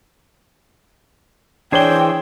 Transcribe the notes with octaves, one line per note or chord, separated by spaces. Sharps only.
E3 D4 G#4 C5 C#5 G5 G7